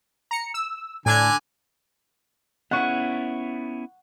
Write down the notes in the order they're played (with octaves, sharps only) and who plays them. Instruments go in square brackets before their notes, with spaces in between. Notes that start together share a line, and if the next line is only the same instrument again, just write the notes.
[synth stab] A#5 C#7
E6
[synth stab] A2 D4 G#6 [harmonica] D3 G#5
[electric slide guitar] B3 C#4 E4 [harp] F#5 C#6